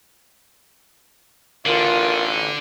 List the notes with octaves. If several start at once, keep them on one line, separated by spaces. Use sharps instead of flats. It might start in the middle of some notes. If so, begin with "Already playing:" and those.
A1 D3 F4 A#4